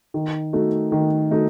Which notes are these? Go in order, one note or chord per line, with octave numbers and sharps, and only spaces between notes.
D#3
A3 D#4 F#4 A4
D#3
A3 D#4 F#4 A4